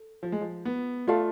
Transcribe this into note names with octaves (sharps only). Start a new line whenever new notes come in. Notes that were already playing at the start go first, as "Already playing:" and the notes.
Already playing: A4
F3
G#3
F3
B3
A3 F4 A4 D5 F5